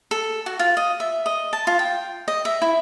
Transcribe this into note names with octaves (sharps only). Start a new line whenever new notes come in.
A4
F#4
F4
D#5
E5
D#5
A5
F4
G5
D#5
E5
E4